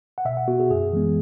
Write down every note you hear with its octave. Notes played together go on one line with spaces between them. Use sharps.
F#5
B2 E5
F#5
B3 F#4
G#4
F#2 G#4
E3 G#3 B3